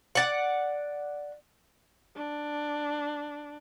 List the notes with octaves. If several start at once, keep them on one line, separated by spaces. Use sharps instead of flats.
D5 F#5
D4